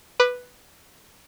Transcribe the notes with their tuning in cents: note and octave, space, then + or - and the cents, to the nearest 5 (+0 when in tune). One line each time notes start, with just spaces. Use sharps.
B4 +0 D6 +35